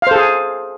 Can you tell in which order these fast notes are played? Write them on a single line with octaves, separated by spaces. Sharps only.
F5 C5 A4 G#4